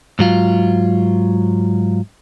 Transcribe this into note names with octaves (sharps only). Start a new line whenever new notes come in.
G#2 F#3 F4